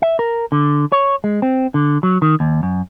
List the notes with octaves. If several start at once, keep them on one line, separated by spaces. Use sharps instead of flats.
E5
A#4
D3
C#5
G#3
C4
D3
F#3
D#3
D#2
F#2